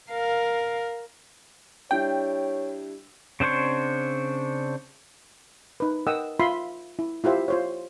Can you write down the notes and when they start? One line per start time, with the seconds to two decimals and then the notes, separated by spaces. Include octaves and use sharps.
0.11 A#4 F5
1.91 G3 D4 E4 C#5 G5
3.40 C#3 C4 D4 C5 C#5
5.80 D#4 B4
6.07 A#4 D#5 F#5 G5 D#6 E6
6.40 F4 E5 B5 C6
6.99 E4
7.24 E4 F4 G4 C5 E5
7.48 F4 C5 C#5